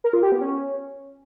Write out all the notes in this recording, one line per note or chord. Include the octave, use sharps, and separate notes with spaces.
A#4
F4
G4
B3
C#4